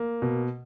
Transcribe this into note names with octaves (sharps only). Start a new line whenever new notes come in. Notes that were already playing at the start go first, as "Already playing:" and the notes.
Already playing: A#3
B2